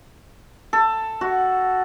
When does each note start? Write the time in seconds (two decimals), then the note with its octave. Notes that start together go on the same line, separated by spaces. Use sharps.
0.73 A4
1.21 F#4